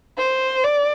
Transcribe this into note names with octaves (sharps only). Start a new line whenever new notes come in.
C5
D5